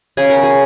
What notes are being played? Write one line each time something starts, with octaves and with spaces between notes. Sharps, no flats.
C#3 G#4
A#4
G#4